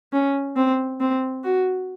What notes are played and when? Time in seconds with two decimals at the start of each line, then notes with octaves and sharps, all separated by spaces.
0.13 C#4
0.56 C4
1.00 C4
1.44 F#4